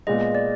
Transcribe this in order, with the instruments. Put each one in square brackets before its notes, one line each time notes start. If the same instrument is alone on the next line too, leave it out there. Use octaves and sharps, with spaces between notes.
[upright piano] A#2 G#3 B3 [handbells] D#5
[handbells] D#5
D5